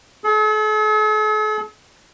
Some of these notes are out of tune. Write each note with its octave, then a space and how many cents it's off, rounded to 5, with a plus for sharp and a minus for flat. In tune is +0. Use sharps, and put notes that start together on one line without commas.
A4 -45